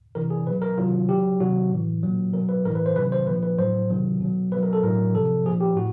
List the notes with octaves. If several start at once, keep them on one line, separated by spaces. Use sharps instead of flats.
C3 E3 A#4
G#4
B2 F#3 B4
A#4
C3 D#3 F#3 F4
C#3 F#3 G4
C3 D#3 F#3 F#4
A2 E3
A#2 F#3
B2 F#3 A#4
B4
A2 E3 A#4
B4
C5
C3 D#3 F#3 B4
C5
A#2 F3 B4
B4
A2 F#3 C5
C3 D#3 F#3
B2 F#3
B2 B4
F#3
A#4
A4
A2 F#3 A#4
C3 F3 A4
A#2 F3 G#4
G4
A2 F#4